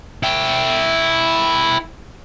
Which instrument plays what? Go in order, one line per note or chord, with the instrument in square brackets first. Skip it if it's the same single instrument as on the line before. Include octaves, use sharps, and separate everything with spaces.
[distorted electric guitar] E4 G5